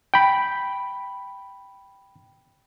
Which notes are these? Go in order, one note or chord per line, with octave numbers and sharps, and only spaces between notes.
G5 B5